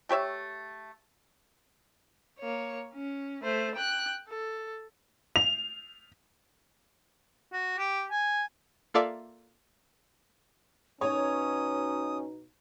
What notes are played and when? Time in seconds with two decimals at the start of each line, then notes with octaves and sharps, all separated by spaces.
0.09 A3 G4 C#5 E5
2.40 A#3 C#5
2.94 C#4
3.43 A3 C5
3.75 G5 F#6
4.29 A4
5.36 F7
7.52 F#4
7.78 G4
8.11 G#5
8.94 A#3 F4 A4 D5 E5 F5
11.01 B2 C#4 D#4 C#5 D#6